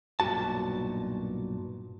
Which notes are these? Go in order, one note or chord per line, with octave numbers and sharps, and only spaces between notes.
B1 G2 A#2 F#4 A5